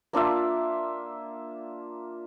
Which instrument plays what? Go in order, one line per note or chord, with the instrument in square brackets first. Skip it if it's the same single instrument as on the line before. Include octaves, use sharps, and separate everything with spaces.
[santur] A#3 D4 F4 E5